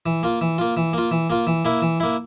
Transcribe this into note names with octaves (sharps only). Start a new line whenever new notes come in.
E3
A#3 F4
E3
A#3 F4
E3
A#3 F4
E3
A#3 F4
E3
A#3 E4
E3
A#3 E4